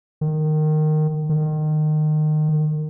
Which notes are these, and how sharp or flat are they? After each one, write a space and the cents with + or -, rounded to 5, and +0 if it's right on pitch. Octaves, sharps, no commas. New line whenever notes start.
D#3 -15
D#3 -25